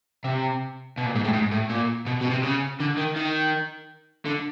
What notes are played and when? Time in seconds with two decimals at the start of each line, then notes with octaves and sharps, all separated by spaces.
0.24 C3
0.97 B2
1.06 A#2
1.15 G#2
1.24 A2
1.33 G#2
1.52 A2
1.70 A#2
2.06 B2
2.21 B2
2.30 C3
2.43 C#3
2.80 D3
2.97 D#3
3.16 D#3
4.25 D3